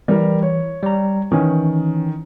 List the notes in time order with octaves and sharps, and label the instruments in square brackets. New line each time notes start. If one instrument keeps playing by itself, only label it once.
[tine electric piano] E3 [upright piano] G3 A#4
[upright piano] C#5
[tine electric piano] G3 A#5
[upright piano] D#3 [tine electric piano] E3 C#4